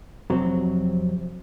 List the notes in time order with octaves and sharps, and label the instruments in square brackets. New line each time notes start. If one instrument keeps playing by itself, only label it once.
[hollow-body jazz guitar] F2 C3 F#3 C4